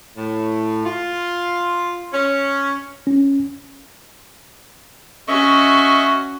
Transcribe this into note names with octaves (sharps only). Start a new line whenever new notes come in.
A2
F4
C#4
C#4
C#4 F#4 D#5 E5 C#6